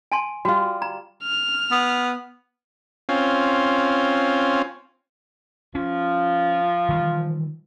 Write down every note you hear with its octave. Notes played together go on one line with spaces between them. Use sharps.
G#5 A5 C6
G3 F4 F#4
A#5
F6
B3
C4 C#4 F4
F3 C#4 F4
D#3 E3 G3